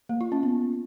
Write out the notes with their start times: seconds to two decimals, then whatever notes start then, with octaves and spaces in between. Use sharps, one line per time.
0.09 A#3
0.21 F4
0.32 C#4
0.43 B3